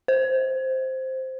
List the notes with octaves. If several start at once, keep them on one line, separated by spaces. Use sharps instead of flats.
C5